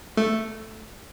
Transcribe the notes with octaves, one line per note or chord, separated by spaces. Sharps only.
A3